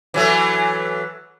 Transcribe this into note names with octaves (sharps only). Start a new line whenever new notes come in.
E3 F#3 A3